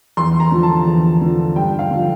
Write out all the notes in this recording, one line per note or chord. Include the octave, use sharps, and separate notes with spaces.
E2 C6
A#5
D3 F3
A5
E2
D3 F3
G2 G5
F5
D3 F3